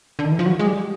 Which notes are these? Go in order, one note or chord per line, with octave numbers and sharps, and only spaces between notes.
D3
D#3
E3
F3
F#3
G#3
G3